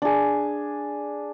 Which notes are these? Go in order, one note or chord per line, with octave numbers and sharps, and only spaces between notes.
D4 G#4